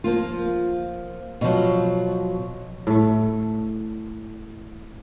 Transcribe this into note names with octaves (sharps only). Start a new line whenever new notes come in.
F3 A#3 F4
B2 D3 F3 F#3
A2 A3